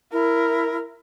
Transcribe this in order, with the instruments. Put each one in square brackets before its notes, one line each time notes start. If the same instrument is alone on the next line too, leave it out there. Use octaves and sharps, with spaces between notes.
[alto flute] E4 [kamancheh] A#4